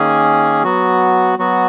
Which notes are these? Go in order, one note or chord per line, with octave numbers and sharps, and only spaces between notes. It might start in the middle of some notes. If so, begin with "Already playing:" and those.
Already playing: D#3 A#3 C#4 G#4
F#3 B3 F#4
F#3 B3 F#4